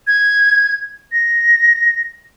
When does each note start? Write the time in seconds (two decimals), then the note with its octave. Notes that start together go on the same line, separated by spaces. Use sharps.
0.07 G#6
1.12 A#6